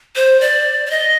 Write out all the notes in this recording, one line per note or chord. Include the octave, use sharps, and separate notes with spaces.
C5
D5
D5
D#5